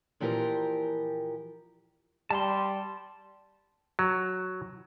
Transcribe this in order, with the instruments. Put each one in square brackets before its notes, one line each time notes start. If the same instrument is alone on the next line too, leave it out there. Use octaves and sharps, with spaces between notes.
[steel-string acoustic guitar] A#2 E3 F3 G4 A#4
[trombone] G3 [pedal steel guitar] A5 C6
[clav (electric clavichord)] F#3